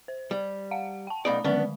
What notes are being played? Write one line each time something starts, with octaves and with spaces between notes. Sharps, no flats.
C5
G3
F5 F#5
G5 A5
B1 A3 D#4 D5 B5 D#6
D3 D#3 G#3 B3 C#4 D4